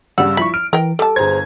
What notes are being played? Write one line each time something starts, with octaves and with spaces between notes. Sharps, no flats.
G2 C#3 G3 F#5 E6
F3 E4 B5 C#6 B6
F6 D7
E3 A#4 G5
G3 A4 A5
G1 G#4 C5 A#5 G#6